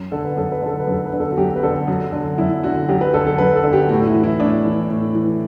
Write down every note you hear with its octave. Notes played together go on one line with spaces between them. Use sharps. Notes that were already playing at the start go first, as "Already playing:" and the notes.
Already playing: F#2
D3 A4
B4
F#2 A4
B4
D3 A4
B4
F#2 A4
B4
D3
A4
F#4
F#2 G4
B4
D3 A4
F#2 F#4
D3
F#2 E4
D3 F#4
F#2 G4
B4
D3 A4
A4
F#2 B4
A4
D3
G4
A2 F#4
E4
E3
E4
A2 D4
E3
A2
E3